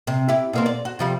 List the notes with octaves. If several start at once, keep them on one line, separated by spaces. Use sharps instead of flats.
C3
E4 G4
B2 A#3 C4
D5
F#4
C3 F3 G3